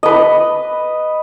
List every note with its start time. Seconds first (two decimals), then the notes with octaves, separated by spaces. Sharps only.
0.03 B4 D#5